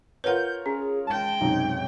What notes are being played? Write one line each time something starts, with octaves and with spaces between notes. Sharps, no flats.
F4 A#4 B4 C#5 F#5 G6
C#4 G#4
G#3 G5 A5
B1 F#2 C3 D#4